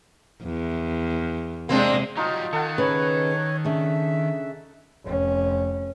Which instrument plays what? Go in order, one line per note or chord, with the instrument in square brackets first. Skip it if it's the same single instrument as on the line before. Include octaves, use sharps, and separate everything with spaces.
[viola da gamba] E2
[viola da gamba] C3 G#3 [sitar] A#3 C4 D4
[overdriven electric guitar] F#3 G3 [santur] D#4 F4 A5
[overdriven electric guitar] D#3 [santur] A4 F#5
[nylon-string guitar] C#3 B4 [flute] C#5
[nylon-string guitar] C#3 D4 [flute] E5
[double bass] F1 C#4